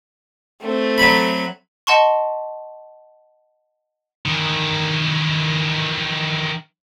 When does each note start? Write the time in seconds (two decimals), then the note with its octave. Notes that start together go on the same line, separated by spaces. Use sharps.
0.61 A3 C4
0.98 F#3 B5
1.87 D#5 F#5 A5 C6 C#6
4.26 D#3 E3